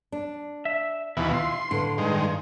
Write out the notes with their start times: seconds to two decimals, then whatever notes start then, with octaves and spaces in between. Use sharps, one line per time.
0.12 D4
0.65 E5
1.17 D#2 B2 E3 E4 F4
1.33 C6
1.71 A2 D3 B4 F5
1.98 G2 D#3 G#3